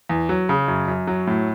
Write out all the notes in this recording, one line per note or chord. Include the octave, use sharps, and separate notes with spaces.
E2
F#3
C#3
F#2
F#2
F#3
A2